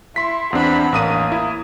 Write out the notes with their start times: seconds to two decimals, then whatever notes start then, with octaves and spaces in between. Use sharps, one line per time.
0.16 E4 C6 B6
0.53 E2 C4 D4 F#5 B5
0.92 A1 A#3 D#6 D#7
1.32 E4